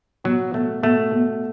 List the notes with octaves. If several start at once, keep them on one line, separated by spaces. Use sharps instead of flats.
B2 F#3
B2 A3
B2 A3
B2